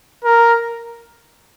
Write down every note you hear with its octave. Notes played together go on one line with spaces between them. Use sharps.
A#4